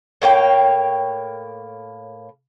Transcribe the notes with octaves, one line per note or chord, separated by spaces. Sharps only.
A2 A#3 C#5 G5